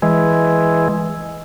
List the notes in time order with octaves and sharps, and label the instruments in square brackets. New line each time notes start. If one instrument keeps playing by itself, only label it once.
[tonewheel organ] E3 G#3